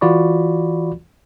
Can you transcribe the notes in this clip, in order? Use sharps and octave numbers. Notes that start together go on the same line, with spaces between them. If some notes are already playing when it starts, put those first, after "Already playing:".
E3 F4 F#4 D5 B5 C#6